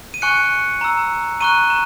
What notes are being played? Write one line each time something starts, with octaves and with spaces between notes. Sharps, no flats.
D#7
G#5 C#6 F#6 C#7
A#5 E6
A#5 C#6 F#6 D#7
E7